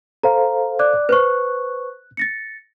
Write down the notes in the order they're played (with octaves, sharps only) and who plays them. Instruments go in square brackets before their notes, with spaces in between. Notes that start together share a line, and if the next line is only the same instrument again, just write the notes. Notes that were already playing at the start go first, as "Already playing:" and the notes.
[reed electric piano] A4 C5 F5 [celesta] A#5
[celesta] D5 D6 F#6
[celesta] B4 C5 C#6 [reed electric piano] F#6
[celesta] A6 A#6 C#7